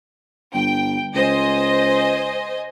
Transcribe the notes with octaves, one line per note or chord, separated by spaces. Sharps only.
G1 G5
C#2 C5 D#5 G#5